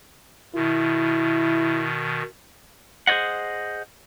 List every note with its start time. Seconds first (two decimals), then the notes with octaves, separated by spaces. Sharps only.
0.55 B2 D#3 E4
3.07 G#4 C5 C#5 D#5 F#5